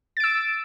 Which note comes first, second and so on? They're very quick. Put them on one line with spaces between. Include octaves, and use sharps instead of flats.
A6 D7 E6